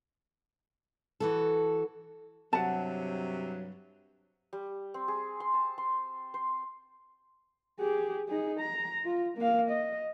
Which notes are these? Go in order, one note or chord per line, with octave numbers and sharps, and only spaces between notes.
E3 F#4 A4
G2 C3 F#3 F#5 A5
G3
C4
G#4
C6
A5
C6
C5
G4 G#4
D#4 G#4
A#5
F4
A#3 F5
D#5